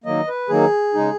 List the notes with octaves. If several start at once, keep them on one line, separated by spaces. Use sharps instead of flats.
D#3 F#3 A#3 D#5
B4
D#3 F#3 A#3 G#4
C#3 G#3 D#4